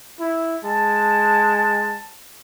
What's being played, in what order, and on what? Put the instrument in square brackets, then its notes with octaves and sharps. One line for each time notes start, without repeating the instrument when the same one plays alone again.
[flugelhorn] E4
[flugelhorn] G#3 [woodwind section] A5